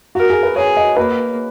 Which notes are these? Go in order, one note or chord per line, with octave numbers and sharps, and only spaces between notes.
F#4 A#4
G#4
B4
G#4 C#5
D#5
A#3 B4